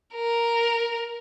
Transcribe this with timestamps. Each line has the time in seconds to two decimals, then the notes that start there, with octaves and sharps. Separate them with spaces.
0.15 A#4